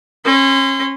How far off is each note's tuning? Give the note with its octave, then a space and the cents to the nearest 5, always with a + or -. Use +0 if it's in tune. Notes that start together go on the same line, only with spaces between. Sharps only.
C#4 -35 C6 -35